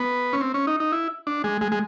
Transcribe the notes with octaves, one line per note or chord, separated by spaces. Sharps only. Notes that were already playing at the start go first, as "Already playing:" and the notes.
Already playing: B3
C#4
C4
C#4
D#4
D#4
E4
D4
G#3
G#3
G#3